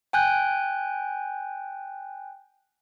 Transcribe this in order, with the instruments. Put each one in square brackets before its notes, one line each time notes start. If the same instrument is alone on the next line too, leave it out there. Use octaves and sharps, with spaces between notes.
[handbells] G5 G#5 F#6 G6